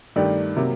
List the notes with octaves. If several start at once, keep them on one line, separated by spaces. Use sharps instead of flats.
G2 D#3 A3 D4 G4
C3 F#3 A#3